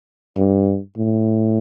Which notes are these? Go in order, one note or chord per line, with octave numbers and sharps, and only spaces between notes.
G2
A2